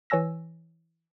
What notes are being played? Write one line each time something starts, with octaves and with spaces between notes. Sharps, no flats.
E3 C#5 G#5 E6 A#6